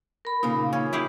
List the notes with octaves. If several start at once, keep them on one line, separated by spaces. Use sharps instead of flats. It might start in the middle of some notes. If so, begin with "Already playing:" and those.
A#4 B5
A#2 C#3 A#3 D#4
C#4
E4 G4 G#4